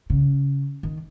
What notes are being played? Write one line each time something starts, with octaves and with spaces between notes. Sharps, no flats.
C#3
D#3